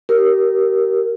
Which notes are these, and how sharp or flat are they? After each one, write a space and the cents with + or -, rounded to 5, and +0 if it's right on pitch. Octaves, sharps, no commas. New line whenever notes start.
G4 -25 A#4 +0